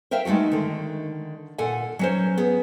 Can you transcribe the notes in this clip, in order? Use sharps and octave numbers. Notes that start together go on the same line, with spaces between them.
A#4 C5 E5 F5 G5
G#3 A3 C#4 D#4 F#4
D3 D#3
A#2 A4 F#5 G#5
F#3 C#4 C5
B3 G#4